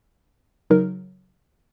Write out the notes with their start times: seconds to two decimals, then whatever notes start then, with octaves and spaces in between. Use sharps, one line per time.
0.70 C#3 F#3 D#4 A#4